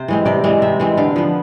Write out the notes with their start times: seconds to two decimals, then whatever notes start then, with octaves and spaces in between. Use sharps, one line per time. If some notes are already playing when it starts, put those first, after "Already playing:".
Already playing: C3 C5
0.08 E3 G#3 C4
0.25 C3 D5
0.44 E3 G#3 C4
0.62 C3 E5
0.80 E3 G#3 C4
0.97 D3 F5
1.16 F3 B3